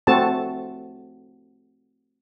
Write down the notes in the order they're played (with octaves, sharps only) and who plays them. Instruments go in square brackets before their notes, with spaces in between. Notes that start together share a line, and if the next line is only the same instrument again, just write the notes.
[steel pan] A3 C4 F#4 A4 A5